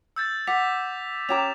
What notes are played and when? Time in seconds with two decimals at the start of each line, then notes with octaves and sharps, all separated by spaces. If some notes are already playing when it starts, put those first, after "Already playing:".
0.16 E6 G6 A6
0.47 F#5 D6 B6 F7
1.29 C#4 G4 A#5 E7 F7